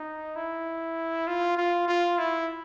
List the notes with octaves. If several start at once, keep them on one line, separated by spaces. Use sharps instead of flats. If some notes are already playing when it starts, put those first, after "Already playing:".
Already playing: D#4
E4
F4
F4
F4
E4